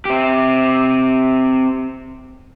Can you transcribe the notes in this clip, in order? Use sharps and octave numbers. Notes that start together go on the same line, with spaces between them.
C4 G4